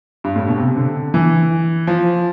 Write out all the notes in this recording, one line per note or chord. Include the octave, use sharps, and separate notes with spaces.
G2
A2
B2
C3
D3
E3
F3